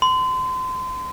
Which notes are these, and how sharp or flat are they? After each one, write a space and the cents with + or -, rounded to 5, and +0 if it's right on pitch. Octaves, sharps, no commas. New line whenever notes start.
C6 -35